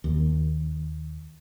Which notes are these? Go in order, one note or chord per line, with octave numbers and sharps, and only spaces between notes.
D#2